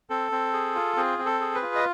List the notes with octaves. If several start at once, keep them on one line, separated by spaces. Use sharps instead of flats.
C4 A4
C4
G#4
F4
C4 G#4
C4
A4
G#4
B4
F4
D#5